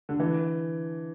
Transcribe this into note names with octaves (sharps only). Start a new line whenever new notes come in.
D3
E3